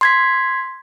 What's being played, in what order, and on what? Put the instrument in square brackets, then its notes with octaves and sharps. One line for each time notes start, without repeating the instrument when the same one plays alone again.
[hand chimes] C6 G#6 B6